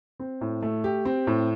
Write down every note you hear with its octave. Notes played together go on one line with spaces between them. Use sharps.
C4
A2
A3
G4
C4
A2